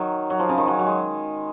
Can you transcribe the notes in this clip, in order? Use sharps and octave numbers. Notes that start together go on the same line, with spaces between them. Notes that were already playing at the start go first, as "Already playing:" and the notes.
Already playing: D#3 F#3
F#3
F3
C#3
D#3
F#3
F#3
G#3